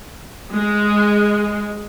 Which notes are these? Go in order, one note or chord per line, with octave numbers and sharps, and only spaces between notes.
G#3